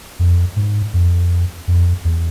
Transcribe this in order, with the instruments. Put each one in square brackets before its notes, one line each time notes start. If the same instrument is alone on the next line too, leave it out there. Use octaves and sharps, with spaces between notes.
[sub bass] F2
G#2
F2
F2
E2